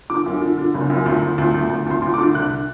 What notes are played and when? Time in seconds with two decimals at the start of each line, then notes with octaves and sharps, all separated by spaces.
0.10 D3 D6
0.26 F#2
0.41 D3
0.58 D3
0.74 F#1
0.90 F#2
1.06 D2
1.22 D2
1.38 D2
1.54 D2
1.70 D2
1.87 D2 C6
2.02 D2
2.14 D3 D6
2.34 C2 F#6